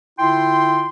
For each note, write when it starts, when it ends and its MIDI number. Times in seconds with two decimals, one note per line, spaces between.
0.19 0.89 50
0.19 0.89 64
0.19 0.89 65
0.19 0.89 79
0.19 0.89 84